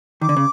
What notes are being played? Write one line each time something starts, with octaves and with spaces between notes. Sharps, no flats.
D#3 D6
D3
C#3